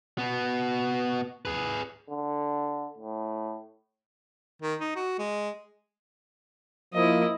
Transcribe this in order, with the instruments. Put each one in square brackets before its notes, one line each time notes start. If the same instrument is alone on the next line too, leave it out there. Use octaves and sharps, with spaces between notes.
[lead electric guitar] B2 B3
G#4 B4
[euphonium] D3
A2
[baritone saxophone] D#3
D#4
F#4
G#3
[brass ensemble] F3 A#3 [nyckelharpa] E4 D#5